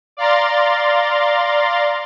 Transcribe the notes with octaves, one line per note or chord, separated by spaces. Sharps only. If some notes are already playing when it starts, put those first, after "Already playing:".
D5 F5 A#5 C6 A6